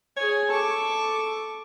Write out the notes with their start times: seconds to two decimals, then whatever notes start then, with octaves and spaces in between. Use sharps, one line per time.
0.17 G#4 C#5 G#5
0.50 A4 C#6 D6